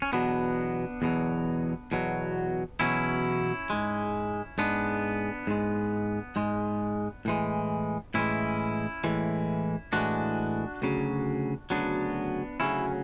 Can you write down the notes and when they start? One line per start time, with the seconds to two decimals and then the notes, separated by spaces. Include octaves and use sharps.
0.02 C#4
0.13 E2 B2 F#3 B3 D4
1.02 E2 B2 F#3
1.92 E2 B2 F#3
2.80 E2 B2 F#3 C#4 E4
3.70 G#2 G#3
4.58 G#2 G#3 B3 D4
5.47 G#2 G#3
6.36 G#2 G#3
7.25 A2 E3 G#3
8.14 A2 E3 G#3 C#4 E4
9.04 A2 E3 G#3
9.93 A2 E3 G#3 D4 F#4
10.82 D2 C#3 F#3
11.70 D2 C#3 F#3 B3 D4
12.60 D2 C#3 F#3 C#4 E4